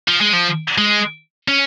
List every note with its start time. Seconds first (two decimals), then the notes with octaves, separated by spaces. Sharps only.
0.08 F3
0.21 G#3
0.33 F3
0.78 G#3
1.48 C#4